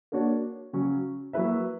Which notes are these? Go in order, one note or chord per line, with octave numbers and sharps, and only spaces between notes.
A#3 D4 F#4 C#5
C#3 F#3 C#4
F#3 A#3 E4 B4 E5